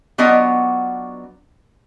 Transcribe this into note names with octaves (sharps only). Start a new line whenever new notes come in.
F#3 B3 D4 F4 D#5 F#5